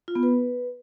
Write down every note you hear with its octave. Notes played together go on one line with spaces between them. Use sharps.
F4
B3
B4